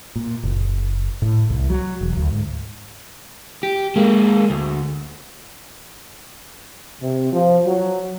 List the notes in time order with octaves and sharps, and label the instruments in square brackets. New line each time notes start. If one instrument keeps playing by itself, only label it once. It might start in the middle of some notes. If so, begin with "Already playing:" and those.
[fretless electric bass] A#2
F#1
A2
C2
F#3
E1
D2
G#2
[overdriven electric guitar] G4
G#3 A#3
D2
[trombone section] C3
F3
F#3